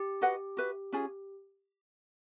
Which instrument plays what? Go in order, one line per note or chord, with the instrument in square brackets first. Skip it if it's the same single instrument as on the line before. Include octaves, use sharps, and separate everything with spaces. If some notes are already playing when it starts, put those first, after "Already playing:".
Already playing: [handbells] G4
[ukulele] F#4 B4 D#5 F#5
F#4 B4 E5
C#4 F4 G#4